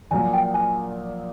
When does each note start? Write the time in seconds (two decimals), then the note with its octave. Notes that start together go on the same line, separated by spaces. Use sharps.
0.11 A#1 A#2 F#3 A#3 G#5
0.33 G5
0.54 G#5